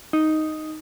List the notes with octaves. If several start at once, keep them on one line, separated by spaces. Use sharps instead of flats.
D#4